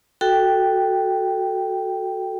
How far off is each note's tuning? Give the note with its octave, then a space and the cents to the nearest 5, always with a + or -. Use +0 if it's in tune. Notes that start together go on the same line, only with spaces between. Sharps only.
F#4 +0 A4 +0 G5 +0